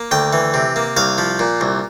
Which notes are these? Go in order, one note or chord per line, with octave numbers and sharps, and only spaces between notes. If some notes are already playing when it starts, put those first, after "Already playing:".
Already playing: A#3
D2 G5
E3
C3
A#3
C2 F5
F3
A#2
C2